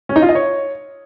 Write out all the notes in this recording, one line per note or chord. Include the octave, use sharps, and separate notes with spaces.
C#4
D#4
F4
D#5
C#5